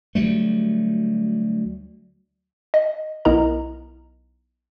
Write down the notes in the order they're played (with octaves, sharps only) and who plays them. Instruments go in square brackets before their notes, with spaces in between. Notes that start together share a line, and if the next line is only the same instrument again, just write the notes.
[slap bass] D2 F#3 G3 A3
[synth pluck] D#5
B1 B3 E4 A#4 D#5 A#5